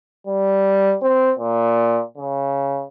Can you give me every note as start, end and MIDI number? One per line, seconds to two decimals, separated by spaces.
0.27 0.95 55
1.03 1.33 60
1.39 2.02 46
2.18 2.84 49